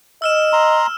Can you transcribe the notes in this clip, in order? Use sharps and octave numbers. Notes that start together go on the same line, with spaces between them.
D#5 E6 F6 E7
A#5 C6